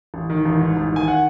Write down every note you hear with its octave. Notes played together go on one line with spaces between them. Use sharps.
A1
D#3
A1
G#2
A1
D#3 G#5
F#5